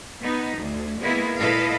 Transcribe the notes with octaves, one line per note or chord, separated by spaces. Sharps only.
B3 D#4
D2
G#3 A#3 B3 E4 G#4
A#2 E4 A4 B4 D#5 F5